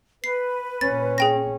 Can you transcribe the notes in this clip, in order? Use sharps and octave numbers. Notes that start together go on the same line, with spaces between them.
B4 C7
A#2 C#4 A6
G#4 G5 A#6